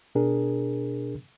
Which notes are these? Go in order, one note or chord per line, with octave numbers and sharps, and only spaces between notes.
B2 D4 G#4 A#4